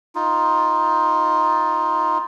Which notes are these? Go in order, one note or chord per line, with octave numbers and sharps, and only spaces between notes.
D#4 F4